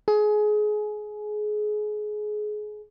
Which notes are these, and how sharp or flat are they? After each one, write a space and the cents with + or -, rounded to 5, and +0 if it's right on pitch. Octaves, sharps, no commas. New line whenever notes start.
G#4 +25